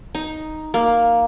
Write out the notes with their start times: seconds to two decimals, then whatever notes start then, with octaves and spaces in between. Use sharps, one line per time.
0.15 D#4
0.74 A#3